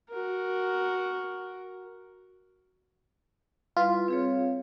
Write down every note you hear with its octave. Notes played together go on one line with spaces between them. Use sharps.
F#4 A#4
G3 E4 F4 B4
C4 G#4 C#5